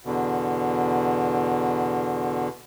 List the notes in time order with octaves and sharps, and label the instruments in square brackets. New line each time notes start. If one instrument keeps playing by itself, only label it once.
[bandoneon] E2 B2 D3